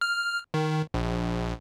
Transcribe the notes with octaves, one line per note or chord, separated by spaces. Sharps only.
F6
D#3
A#1